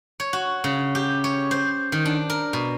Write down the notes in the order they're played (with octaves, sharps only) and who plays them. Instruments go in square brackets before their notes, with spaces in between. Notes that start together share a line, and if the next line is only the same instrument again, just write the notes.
[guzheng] C#5
F#4
C#3
G4
C#5
C5
D#3
D4
A#4
B2